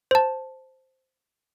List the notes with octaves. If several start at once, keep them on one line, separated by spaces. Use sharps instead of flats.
C5 A5